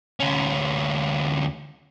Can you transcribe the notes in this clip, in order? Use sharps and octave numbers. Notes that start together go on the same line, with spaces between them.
D2 C#4